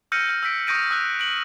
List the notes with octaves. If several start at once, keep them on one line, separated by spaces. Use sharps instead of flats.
E6 F6 G6 A#6 C#7 D#7
F6 G6
E6 G6 B6 D7
C#6 D#6 G6 A#6 D7 D#7
D#6 E6 F#6 G6
D7 F#7